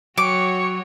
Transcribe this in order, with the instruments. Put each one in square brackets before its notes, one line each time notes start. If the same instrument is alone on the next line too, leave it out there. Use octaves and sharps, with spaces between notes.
[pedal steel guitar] F#3 [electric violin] F#4 C#5 [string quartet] G5 C#6 [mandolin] D6